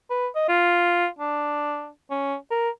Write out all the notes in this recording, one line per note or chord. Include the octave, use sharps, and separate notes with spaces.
B4
D#5
F4
D4
C#4
A#4